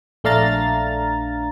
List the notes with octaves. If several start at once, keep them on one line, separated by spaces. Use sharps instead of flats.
A#1 A3 D4 F5 A#5 A6